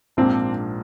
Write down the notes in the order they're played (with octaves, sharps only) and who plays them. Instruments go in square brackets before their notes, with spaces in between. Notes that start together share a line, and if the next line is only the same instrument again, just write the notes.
[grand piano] A#1 G#2 F3 A#3 D4 [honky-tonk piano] C4